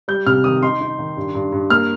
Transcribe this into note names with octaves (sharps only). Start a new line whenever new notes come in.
G3 G6
C3 F6
D#3 D#6
D#4 C6
D#4
D#3
G2
G2
G2
A#3 F6